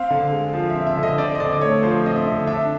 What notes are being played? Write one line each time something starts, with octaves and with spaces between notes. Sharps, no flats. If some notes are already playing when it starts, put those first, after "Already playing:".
Already playing: C4 F5
D3
G#3
F3
E5
C4
E5
D3
D#5
C4 D5
D#5
D3 D5
D5
A3 C#5
F3 C5
C4 D#5
E5
D3
D4 E5